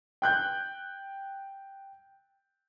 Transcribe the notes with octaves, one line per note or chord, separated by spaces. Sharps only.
G5 F#6 G6